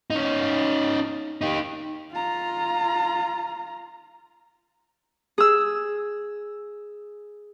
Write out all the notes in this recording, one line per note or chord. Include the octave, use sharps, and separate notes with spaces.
C#4 D#4
D#4 G4
F4 A#5
G#4 E6